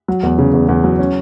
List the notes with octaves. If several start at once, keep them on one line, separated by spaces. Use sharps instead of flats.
F#3
E2
C#3
E2
E2
F#3
C#4